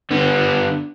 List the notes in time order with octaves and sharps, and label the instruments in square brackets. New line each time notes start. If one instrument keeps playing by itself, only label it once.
[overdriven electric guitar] D3 B3